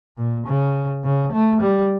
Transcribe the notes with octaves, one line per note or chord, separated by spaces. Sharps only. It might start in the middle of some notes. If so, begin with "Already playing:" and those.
A#2
C#3
C#3
A3
G3